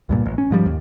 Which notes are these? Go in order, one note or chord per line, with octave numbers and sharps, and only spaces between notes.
C#2 G2 A#2
A1
C#4
G#2 F3 G3
D#2